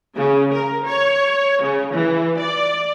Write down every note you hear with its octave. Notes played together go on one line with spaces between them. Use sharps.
C#3
A#4
C#5
C#3
E3
D5